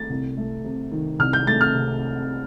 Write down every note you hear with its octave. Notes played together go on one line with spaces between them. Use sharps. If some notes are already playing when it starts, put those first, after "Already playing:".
Already playing: A3 A6
C2
A3
C3
D#3
C2 F6
G6
A3 A6
F6
C3